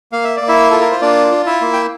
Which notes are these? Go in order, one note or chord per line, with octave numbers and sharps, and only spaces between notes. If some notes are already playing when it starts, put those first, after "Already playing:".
A#3 F5
E5
D5
A#3
E4 E5
F4 A4
A#4
C5
A#3 D4 D5
F4
E4 E5
A#3
G5